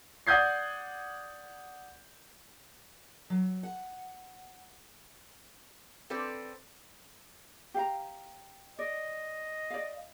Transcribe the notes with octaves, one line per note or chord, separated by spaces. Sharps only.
D5 F#5 D#6 G6 G#6 C7
F#3
F#5
C4 A4 B4 C5 D5
G4 F5 A#5
D5 D#5
D5 F5